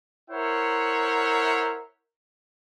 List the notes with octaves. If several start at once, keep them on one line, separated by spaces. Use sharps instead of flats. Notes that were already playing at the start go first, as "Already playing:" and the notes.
E4 A#4 C5 C#5 E5 F#5